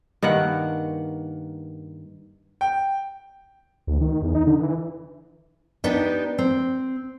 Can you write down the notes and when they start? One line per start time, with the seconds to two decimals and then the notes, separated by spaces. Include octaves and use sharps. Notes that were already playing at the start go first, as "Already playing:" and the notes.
0.22 G2 D#3 A#3 F#5
2.61 G5
3.87 D2
4.01 D#3
4.22 E2
4.35 D#4
4.47 D3
4.59 E3
5.84 B3 D4 D#4 G4 B4
6.38 C4